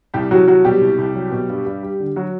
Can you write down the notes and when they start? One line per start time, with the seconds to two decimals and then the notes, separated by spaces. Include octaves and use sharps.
0.14 C2 G3 G4
0.31 C2 F#3 F#4
0.48 F#3 F#4
0.64 B2 G3 G4
0.81 C2
0.98 C2
1.15 F#3
1.32 B2
1.49 G2
1.65 G2
1.83 G3
2.00 D3
2.16 F#3 F#4